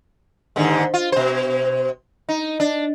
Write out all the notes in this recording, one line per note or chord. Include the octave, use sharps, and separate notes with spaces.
D#2 G#2 D3
F4
B2 C5
D#4
D4